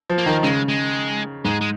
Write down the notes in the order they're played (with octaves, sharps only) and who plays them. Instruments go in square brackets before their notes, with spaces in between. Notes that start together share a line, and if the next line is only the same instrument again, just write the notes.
[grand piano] F3
[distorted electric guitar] A#3
[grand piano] D#3
[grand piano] C#3 [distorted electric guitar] G#3
[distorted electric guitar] G#3
[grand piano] G#2 [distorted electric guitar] G#3
[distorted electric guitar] G#3